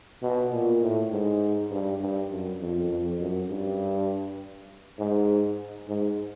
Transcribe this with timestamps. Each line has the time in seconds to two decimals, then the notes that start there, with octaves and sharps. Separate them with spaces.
0.22 B2
0.52 A#2
0.82 A2
1.11 G#2
1.71 G2
2.00 G2
2.30 F#2
2.60 F2
2.89 F2
3.20 F#2
3.49 G2
4.98 G#2
5.88 G#2